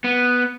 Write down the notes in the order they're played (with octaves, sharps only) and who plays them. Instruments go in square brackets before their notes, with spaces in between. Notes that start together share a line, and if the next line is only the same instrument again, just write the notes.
[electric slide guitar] B3